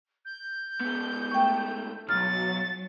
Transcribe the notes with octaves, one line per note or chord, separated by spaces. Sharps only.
G6
G#2 B3
A3 G5 C#6
B1 F#3 F6 A6